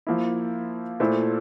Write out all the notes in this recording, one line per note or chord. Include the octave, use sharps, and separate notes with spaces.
F3 A#3 E4
A#2 A3 E4 A4 C5